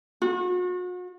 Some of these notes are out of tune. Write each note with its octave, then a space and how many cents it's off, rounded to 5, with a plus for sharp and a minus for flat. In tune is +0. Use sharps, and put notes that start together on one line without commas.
F#4 -40